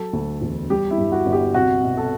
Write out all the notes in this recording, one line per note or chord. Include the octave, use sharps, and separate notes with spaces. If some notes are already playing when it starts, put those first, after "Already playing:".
Already playing: F#3 A4
D2
E1
G3 G4
E4
G2
F#4
G1
G4
C2 F#4
B2
A4